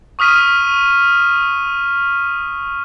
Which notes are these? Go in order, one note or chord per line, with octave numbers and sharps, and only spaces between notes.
C#6 D#6 F6 B6 D#7